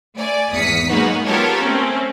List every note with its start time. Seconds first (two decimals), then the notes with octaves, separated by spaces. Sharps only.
0.16 A3 D5 G#5
0.52 G#1 E2 D#6 B6 C#7
0.88 F#3 G#3 A#3 B3 D#4 F#4
1.25 B3 F4 G4 A4 A#4 C#5
1.62 A3 C4 C#4